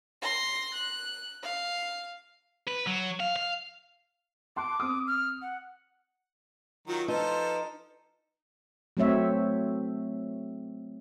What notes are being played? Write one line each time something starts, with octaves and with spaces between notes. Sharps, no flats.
C6 A#6
F#6
F5
B4
F#3
F5
F5
A5 C6 D6 F#6
C4 D#6
F6
F#5
D#3 F#3 F4
F3 D#4 A4 B4 C5
F#3 A3 C4 C#5 E5